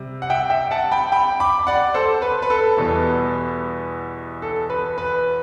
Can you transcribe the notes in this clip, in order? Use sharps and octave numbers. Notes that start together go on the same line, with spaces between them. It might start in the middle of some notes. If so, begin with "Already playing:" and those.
Already playing: C3 G3
F#5
E5 G5
E5 G5
F#5 A5
G5 B5
G5 B5
B5 D6
D5 F#5
A4 C5
B4
B4
A4
E2 B2 G3 B3
A4
B4
B4